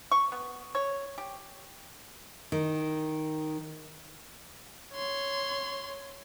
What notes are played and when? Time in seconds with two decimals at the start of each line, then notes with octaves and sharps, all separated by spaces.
0.11 C#6
0.32 B3
0.75 C#5
1.18 G4
2.52 D#3
4.93 C#5 C6